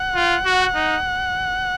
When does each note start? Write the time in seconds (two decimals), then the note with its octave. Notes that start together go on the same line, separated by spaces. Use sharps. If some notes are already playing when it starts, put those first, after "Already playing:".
Already playing: F#5
0.15 F4
0.45 F#4
0.75 D#4